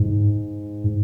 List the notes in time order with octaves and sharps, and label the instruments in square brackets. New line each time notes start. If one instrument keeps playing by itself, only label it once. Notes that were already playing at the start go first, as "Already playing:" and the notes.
Already playing: [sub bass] G#2